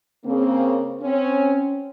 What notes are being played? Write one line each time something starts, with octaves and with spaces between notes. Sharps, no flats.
C#3 A#3 C4
C4 C#4